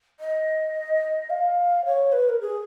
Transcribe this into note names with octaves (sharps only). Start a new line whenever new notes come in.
D#5
F5
C#5
B4
A#4
G#4